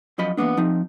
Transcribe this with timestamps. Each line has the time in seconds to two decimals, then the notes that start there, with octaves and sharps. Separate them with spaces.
0.18 F#2 F3 D#5 B5
0.37 E3 F#3 A#3 B3 D4
0.57 F3 C4 D#4